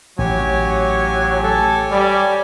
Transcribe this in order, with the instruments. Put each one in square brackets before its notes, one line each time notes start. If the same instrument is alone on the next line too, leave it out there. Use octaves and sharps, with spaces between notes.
[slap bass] A1 [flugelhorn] F#3 [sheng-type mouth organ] G4 C#5 G#5
[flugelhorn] A4
G3